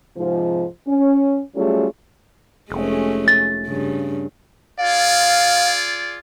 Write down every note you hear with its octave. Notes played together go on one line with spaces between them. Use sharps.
G#2 C3 F3
C#4
F#3 G3 A3 C#4 F4 G#4
F1 G#3 A3 C#4
A6
G2 C#3
F4 G#4 D5 F5